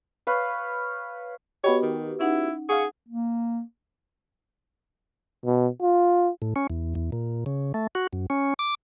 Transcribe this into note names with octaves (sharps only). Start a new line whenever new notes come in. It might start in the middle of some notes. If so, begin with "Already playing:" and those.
B4 C#5 F5
B3 F#4 G4 C#5 D#5 B5
D#3
C#4 D#4 E4 F#5
G#4 F5 F#5 C#6
A#3
B2
F4
A2
C#4
E2
E2
A#2
C#3
A3
F#4
F#2
C#4
D6